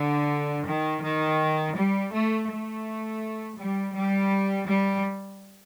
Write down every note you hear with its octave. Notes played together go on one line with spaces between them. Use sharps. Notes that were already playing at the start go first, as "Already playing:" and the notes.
Already playing: D3
D#3
D#3
G3
A3
A3
G3
G3
G3